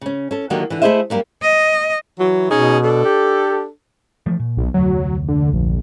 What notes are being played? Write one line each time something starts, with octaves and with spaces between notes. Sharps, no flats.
C#3 C#4
C#4 A4
D3 D#3 F#3 A#3 F#4 G4
D3 E3
A3 E4 G#4 C5 D#5 E5
F#2 G3 A#3
D#5
E3 F#3
B2 C#4 D#4 G#4
D4 A4
G4
E3 F3 A3
A#2
B1
F1 D2 F#3
D3
A#1